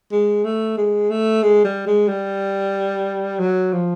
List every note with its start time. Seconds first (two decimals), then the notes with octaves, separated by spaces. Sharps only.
0.12 G#3
0.44 A3
0.78 G#3
1.10 A3
1.43 G#3
1.64 G3
1.87 G#3
2.08 G3
3.40 F#3
3.73 F3